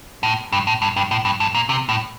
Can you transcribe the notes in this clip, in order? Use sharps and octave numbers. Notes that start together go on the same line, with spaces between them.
A2
G2
A2
G2
G2
A2
G2
G2
A#2
C3
A2